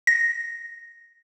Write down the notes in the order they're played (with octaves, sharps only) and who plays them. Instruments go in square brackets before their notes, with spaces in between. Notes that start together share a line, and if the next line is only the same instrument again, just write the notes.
[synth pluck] A#6